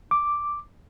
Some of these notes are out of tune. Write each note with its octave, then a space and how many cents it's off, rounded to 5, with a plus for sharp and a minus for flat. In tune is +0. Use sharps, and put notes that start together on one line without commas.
D6 +0